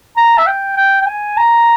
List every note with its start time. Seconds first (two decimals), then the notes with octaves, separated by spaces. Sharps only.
0.17 A#5
0.38 E5
0.47 G5
0.76 G5
1.02 G5
1.06 G#5
1.37 A#5